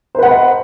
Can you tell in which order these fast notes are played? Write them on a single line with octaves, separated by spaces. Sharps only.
C5 B4 F#5 B5 D#5